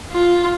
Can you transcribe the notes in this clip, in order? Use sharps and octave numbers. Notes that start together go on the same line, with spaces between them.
F4